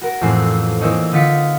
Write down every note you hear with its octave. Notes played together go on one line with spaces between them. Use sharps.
F#4 A#4
A1 F2 E3 C4 G#4 C6
E3 A#3 C4 D4 D#4 C#5
D3 D#4 F4 B6 C#7